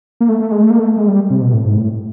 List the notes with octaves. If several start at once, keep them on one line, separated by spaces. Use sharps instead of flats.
A#3
A3
A3
G#3
A3
A#3
A3
G#3
G3
C3
B2
A2
G#2
A2